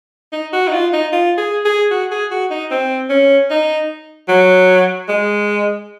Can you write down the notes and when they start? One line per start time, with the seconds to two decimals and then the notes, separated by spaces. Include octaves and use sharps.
0.33 D#4
0.53 F#4
0.68 D#4
0.73 F4
0.93 D#4
1.13 F4
1.38 G#4
1.65 G#4
1.91 F#4
2.11 G#4
2.31 F#4
2.51 D#4
2.71 C4
3.10 C#4
3.50 D#4
4.29 F#3
5.08 G#3